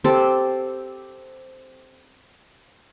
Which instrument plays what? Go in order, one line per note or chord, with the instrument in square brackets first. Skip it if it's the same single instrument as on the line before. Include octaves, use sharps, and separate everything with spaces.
[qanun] C4 G4 A4